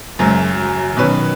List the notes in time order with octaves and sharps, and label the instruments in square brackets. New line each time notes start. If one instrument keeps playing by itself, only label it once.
[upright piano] F#1 F#2 F#3 [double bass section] G#3
[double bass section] F#3
[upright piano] B2 F#3 C#4 B4 [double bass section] D#3